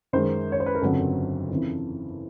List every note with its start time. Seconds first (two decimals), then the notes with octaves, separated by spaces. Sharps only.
0.13 F#2 D#3 G#3 C5
0.52 C#5
0.60 C5
0.66 B4
0.75 A#4
0.82 G1 F2 C#3 F#3 A4
1.50 F2 C#3 E3